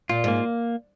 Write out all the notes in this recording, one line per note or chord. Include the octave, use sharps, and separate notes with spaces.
A#2 F4
G#2 A#3